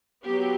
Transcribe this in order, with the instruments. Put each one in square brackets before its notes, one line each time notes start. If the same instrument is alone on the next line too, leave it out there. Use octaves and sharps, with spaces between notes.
[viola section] F#3 B3 G4